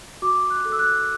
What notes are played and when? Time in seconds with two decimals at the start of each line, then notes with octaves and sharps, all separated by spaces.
0.22 F#4 D6
0.50 F#6
0.65 A4
0.72 E6
0.79 F#6